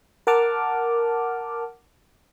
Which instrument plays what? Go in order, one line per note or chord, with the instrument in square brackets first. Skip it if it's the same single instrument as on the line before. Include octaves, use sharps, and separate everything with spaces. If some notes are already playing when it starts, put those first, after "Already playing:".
[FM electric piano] A#4 F#5 A5 D6 F6